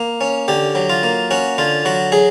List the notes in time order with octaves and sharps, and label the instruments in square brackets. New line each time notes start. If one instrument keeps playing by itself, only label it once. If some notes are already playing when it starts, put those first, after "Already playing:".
Already playing: [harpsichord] A#3
C#4
D3 G4
F#3
F4
A#3
C#4 F#4
D3 F4
F#3 F#4
F#3 G#4